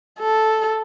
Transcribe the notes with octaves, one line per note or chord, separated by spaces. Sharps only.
A4